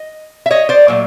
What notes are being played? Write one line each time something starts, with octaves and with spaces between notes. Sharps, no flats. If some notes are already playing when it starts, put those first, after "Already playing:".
Already playing: D#5
E5
C#5 D#5
C5 D5
A#2 F#3 A3